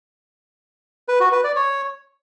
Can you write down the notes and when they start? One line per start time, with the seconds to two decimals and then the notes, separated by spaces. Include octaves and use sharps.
1.08 B4
1.20 F#4
1.32 B4
1.44 D5
1.56 C#5